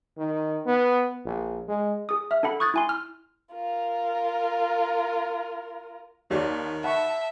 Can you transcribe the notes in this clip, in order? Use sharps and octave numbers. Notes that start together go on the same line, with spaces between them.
D#3
B3
A#1
G#3
G#4 D#6
E5 F6
D4 A4 F#5 B5
C#6 D#6 F#6 G#6 A6
E4 G#5 C6
F6
F4 A#4
D#2 D#3 C#5 D5
E5 F#5 A5 B5 C#6